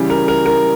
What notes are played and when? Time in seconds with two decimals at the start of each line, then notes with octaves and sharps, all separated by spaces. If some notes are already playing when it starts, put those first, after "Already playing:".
Already playing: C#3 E3 G3
0.10 A#4
0.28 A#4
0.46 A#4